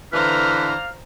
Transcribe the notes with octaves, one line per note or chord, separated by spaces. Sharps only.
D3 E3 B4 C5 D5 F5 A#5 F6